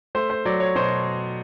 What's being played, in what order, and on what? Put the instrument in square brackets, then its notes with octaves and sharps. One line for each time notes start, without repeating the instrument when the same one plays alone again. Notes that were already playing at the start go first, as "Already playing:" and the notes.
[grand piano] A3 C5
C5
F#3 D5
C#5
B2 C5